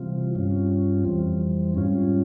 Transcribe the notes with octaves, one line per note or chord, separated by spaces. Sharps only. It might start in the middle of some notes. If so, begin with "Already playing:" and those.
Already playing: C3 E3 G3 C4 F4
G2 G3 C#4 F4
F2 E3 G3 C4
G#2 G3 C#4 F4